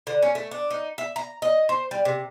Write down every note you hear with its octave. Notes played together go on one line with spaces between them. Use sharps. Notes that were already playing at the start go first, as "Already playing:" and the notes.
D3
C#4
A3
D4
D#4
E5
A#5
D#5
C5
G3
C3